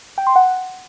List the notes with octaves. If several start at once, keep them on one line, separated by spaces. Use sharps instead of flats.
G5
C6
F#5